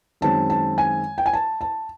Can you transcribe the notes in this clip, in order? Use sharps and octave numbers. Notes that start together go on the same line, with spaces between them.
F#2 D#3 G#3 C4 A5
A5
G#5
G5
G#5
A5
A5